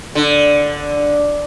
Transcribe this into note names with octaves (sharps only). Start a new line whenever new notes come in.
D3